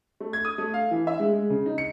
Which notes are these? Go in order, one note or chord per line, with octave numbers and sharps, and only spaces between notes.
A3
G#6
D#6
A3
F5
E3
E5
G#3
G#3
C#3
D#4
C#7